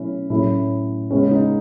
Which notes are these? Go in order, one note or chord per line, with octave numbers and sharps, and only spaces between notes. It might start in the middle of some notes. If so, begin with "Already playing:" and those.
Already playing: B2 F#3 A3 C#4 E4
A2 F#3 A3 C#4 E4
C#3 G#3 B3 C#4
D#4